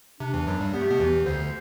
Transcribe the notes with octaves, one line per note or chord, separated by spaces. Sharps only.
C3 D4
E2 E3
F#2 F#3
G2 G3
B3 G4
A3
B2 B3
E2 E3
D2 D3 C5